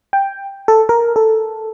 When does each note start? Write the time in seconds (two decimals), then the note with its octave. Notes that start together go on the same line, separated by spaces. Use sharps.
0.13 G5
0.68 A4
0.89 A#4
1.16 A4